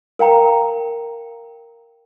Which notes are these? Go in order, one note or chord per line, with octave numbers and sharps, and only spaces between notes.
A#4 F5 G5 A#5